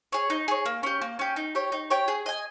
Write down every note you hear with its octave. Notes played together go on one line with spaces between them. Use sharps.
G#4 C#5
D#4
G#4 C#5
A#3
C#4 G4
A#3
C#4 G4
D#4
G4 C#5 G5
D#4
G4 C#5 G5
G#4
D#5 G#5